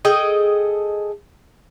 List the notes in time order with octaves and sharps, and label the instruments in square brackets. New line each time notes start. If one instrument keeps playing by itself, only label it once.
[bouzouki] G#4 A4 D#5 G5